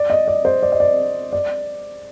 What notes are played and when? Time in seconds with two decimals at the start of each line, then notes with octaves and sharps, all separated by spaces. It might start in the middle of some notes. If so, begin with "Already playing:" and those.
Already playing: D5
0.10 D#5
0.28 D5
0.45 C5
0.63 D5
0.72 D#5
0.80 D5
1.33 D5